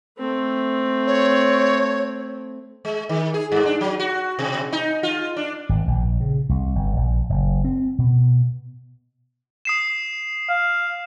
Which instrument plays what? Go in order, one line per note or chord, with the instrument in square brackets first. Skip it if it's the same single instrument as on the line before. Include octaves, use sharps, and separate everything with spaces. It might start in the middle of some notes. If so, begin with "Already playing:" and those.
[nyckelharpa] A3 C4
[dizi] C#5
[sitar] G#3
D#3
G#4
G2
D4
F#3
F#4
B2
D#4
F4
D4
[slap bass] G#1
A#1
C#3
C2
G1
A#1
F#1
C4
B2
[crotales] D#6 C7 E7
[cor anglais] F5